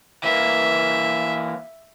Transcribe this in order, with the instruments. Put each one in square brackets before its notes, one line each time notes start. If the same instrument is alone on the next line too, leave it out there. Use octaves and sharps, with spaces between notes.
[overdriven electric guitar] E3 A#3 [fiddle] E5